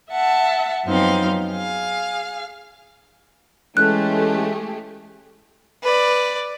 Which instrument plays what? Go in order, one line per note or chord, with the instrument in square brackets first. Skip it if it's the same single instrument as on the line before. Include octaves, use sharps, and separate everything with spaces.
[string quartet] E5 F#5 A5
F#2 F3 B3 C4 D#4 F5
G#4 F5
[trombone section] E3 G#3 C#4 [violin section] A3 G4 G#4 [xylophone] F#6
[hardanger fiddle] B4 D5